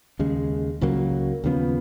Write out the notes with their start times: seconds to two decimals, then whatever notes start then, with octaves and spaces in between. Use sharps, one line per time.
0.19 D#2 C#3 G#3
0.81 C#2 C#3 F#3 A#3
1.44 D#2 C#3 F3 B3